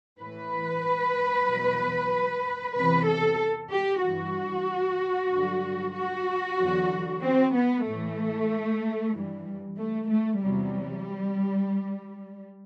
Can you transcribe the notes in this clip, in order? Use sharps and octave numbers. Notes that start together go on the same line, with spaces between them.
A2 E3 B4
E2 B2 F#3
E2 C3 E3 B4
A4
G4
E3 F#4
G2
G2 D3 F#3
F#4
E2 D3 F#3
C4
B3
A2 E3 A3
G2 E3 G3
A3
A3
E2 C3 F#3 G3